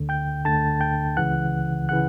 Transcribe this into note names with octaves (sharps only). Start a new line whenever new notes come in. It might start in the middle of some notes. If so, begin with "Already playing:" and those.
Already playing: D2 D3
G5 G6
D2 D3 A5 A6
G5 G6
C#2 C#3 E3 F#5 F#6
C#3 E3 F#5 F#6